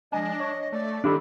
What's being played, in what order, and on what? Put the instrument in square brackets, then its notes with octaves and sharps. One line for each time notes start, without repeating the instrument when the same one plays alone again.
[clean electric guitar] F3 G#3 G#5 [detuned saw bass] D4 [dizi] D#5
[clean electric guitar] C#5
[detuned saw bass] A3 [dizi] D5
[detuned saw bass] D#3 [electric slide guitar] D4 G4 A4 [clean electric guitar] E4